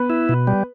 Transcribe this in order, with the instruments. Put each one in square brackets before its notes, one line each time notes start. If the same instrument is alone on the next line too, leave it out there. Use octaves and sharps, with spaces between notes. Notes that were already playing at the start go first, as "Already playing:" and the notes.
Already playing: [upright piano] B3 B4
[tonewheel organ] E4
B2
G3